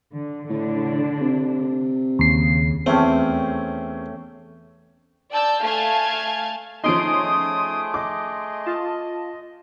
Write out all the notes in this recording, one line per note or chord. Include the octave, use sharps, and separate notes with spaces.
D3
A2 D3 D4
C3
D#2 C#3 C7
E2 A3 C4 C#4 G5
D5 A5 E6 G6
A3 F5 G#5 A5 F6 G#6
F3 A3 C#4 D#4 G#4 C6 D#6 D7
D#5 D6
F4 A5